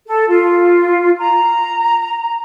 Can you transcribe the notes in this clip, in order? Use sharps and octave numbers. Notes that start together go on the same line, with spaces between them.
A4
F4
A#5